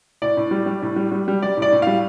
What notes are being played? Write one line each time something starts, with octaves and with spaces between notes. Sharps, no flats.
A2 D5
A2
G3
G3
A2
G3
G3
G3
G3 D5
A2
D5
A2
G3 F5